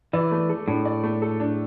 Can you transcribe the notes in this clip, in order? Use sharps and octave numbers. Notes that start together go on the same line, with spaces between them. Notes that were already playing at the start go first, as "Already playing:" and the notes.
E3 D5
A3
A4
A2 D4
D5
A3
A4
D4